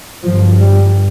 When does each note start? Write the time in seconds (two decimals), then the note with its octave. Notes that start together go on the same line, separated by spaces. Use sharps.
0.24 G1 G2 F3
0.60 G3